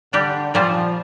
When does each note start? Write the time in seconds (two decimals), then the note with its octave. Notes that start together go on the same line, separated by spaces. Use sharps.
0.13 D3 G3 D4 G4
0.54 A#2 F3 G3 A#3 F4 C5